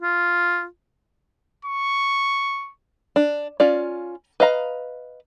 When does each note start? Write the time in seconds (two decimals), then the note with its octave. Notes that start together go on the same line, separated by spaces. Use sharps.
0.02 F4
1.65 C#6
3.16 D4
3.60 C#4 F4 D5
4.40 B4 D#5 F5 A#5